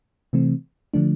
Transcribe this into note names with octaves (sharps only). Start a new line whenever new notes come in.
C3 E3 A3 C4
D3 F3 A3 D4